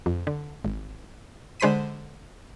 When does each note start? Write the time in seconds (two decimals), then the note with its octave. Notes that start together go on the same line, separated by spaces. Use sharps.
0.06 F2
0.27 D3
0.65 G#1
1.60 D3 G#3 C5 B5 B6 D#7